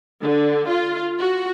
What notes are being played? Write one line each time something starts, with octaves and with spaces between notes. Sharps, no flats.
D3
F4
F#4